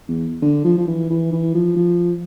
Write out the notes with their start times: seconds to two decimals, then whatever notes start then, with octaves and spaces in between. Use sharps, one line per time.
0.08 E2
0.42 D3
0.64 F3
0.78 F3
0.88 E3
1.10 E3
1.33 E3
1.54 F3
1.76 F3